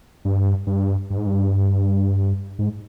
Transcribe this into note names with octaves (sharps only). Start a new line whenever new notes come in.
G2
G2
G2
G#2
G2
G#2